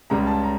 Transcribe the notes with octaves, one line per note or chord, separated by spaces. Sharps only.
C#2 C#3 G3 A#5
A5
A#5